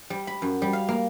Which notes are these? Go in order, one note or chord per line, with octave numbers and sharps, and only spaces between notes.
G3
B5
F#2
G3
F5
A#3